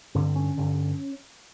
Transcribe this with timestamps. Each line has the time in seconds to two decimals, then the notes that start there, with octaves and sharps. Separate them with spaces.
0.15 G2 D3 C4
0.36 C#4
0.57 G2 D3